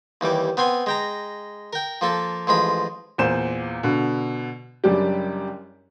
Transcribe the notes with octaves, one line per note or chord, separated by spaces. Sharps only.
D#2 E3 G3 D6
B3 C4 G#5 C6
G#3 G5 A#5
A#4 G5
F3 A#3 A4
A1 F3 G#3 B5
E2 A#2 C5 E7
B2 D3
F#1 F#2 G3 D4 G4